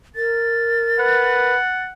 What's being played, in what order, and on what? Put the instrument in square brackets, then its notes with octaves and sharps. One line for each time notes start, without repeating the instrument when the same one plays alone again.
[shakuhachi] A#4 [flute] A6
[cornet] B4 [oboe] F#5